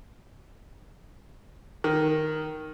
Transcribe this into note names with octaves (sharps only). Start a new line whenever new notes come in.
D#3